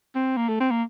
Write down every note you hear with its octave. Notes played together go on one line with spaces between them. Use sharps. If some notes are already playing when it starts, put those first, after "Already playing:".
C4
A#3
A3
C4
A#3